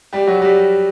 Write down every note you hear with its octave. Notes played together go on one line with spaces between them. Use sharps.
G3 G4
F#3 F#4
G3 G4